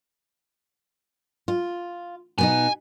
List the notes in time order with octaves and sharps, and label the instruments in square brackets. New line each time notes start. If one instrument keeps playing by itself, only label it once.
[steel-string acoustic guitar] F4
[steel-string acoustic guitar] B2 B3 D#4 [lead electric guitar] G#5